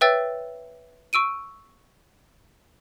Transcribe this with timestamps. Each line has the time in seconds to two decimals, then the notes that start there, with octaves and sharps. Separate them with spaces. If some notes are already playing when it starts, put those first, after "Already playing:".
0.01 B4 C#5 E5 G5 E6 A6
1.13 C#6 E6 D7 D#7